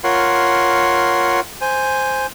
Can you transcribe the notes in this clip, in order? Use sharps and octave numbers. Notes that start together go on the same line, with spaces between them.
F4 A#4 C#5 F#5 C6
C5 G#5